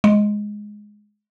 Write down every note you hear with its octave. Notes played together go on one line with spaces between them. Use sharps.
G#3